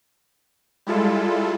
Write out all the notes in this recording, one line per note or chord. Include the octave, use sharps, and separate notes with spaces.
G3 G#3 E4 F4 A4